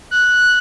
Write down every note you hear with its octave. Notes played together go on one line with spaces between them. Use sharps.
F#6